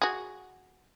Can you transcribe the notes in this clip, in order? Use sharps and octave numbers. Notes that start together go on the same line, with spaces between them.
F#4 G#4